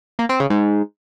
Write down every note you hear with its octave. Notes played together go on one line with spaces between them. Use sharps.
A#3
C4
C#3
G#2